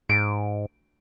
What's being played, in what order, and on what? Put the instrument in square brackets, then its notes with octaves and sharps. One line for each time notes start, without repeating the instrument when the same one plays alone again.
[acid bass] G#2 [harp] D7